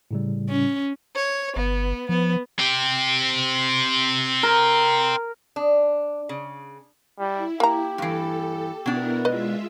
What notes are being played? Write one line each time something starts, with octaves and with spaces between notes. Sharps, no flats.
A2 C#3 G3
C#4
C#5
G1 B3
F3 B3
C4 G4
A#4
D4
C#3
G3 E4
A#3 G4 A#5
G2 E3 A4
B2 B3 D4 E4 A#4
G#3 F4 B4 D#5 E5